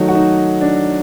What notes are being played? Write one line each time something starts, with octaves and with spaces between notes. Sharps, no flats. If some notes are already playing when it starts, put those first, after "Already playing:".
Already playing: D#3 F#3 A3 D#4
F#4
D#4
D4